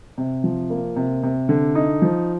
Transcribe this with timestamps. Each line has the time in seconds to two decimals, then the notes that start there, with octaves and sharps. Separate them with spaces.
0.18 C3
0.44 F3
0.70 A#3
0.96 C3
1.23 C3
1.49 D3
1.75 D#4
2.02 F3